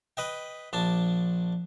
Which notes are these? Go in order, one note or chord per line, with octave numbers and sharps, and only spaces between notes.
B4 D#5 G5
A#1 D4 A5